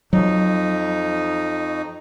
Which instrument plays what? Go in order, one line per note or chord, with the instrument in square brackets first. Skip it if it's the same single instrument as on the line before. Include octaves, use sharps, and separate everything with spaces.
[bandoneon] F2 D#4 [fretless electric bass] F#3